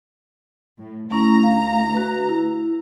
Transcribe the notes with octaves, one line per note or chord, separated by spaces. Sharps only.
A2
D2 A3 C#4 E4 A#5
F5
F#4 B4
E4